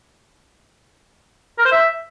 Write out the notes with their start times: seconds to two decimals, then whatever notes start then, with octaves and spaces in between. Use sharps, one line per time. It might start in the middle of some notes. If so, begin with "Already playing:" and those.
1.58 A#4
1.65 C5
1.72 E5